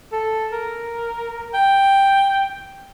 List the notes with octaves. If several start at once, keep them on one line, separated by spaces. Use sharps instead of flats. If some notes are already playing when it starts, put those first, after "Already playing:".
A4
A#4
G5